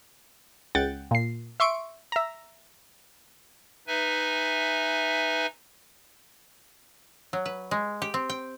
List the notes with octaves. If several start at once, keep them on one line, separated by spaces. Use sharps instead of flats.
C#2 F#5 G5 A6
A#2 C7
E5 C6 C#6 D7
E5 A#5
D#4 B4 E5 G#5
F#3
B4
G#3
G4
C4
G5